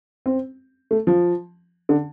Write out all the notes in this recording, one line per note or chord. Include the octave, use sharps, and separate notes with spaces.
C4
A3
F3
D3